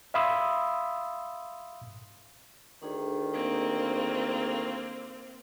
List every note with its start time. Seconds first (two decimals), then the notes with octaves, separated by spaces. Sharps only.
0.14 E5 F5 B5 C6 D#6 E6
2.82 D2 D#3 D4 G#4
3.33 A#3 C4